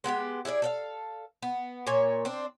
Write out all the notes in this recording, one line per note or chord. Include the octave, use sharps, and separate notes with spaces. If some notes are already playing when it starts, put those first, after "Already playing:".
G#3 B3 F#4 G4
E4 G#4 B4 D5
A4 D5 F5
B3
A#2 A#3 C#5 G#5
C4 D4